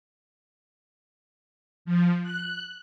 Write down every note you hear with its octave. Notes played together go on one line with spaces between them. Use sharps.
F3
F#6